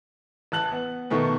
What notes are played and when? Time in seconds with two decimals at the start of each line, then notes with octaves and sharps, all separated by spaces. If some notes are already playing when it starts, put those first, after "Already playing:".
0.52 A1 A5 F#6 F#7
0.72 B3
1.10 B2 D#3 A3 B3